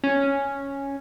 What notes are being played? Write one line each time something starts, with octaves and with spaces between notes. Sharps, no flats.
C#4